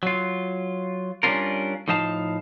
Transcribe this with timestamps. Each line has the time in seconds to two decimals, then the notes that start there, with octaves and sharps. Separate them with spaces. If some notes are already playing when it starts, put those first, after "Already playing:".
0.03 F#3 F4
1.23 G3 C#4 D4 F4 A#4
1.88 A2 F3 D#4 F5 A5